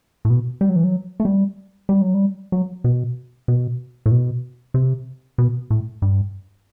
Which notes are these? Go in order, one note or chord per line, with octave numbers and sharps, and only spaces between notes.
A2
B2
G3
F#3
E3
F#3
A3
G3
G3
F#3
G3
F#3
B2
B2
A2
B2
C3
B2
A2
G2